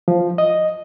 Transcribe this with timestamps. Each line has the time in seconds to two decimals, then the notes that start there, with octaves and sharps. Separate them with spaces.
0.08 F3
0.38 D#5